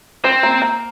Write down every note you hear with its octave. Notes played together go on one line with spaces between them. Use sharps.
C4 C5
A#3
A#3